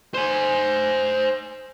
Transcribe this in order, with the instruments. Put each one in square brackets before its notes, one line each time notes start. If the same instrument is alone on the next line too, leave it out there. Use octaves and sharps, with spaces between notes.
[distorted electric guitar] C5 G#5